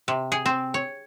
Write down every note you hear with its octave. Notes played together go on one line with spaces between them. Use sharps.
C3
G#4
C4
C#5